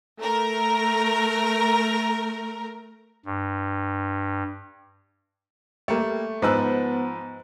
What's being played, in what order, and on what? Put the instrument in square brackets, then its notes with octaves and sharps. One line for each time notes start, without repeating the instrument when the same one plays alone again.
[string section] A3 A#4
[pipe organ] G2
[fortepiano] G3 A#3 [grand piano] A3
[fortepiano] G#2 E6 [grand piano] F3 B4 F#6 [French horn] B3